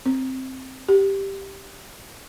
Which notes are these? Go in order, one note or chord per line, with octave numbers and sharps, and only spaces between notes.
C4
G4